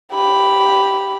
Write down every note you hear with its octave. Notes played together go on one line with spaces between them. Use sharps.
G4 B5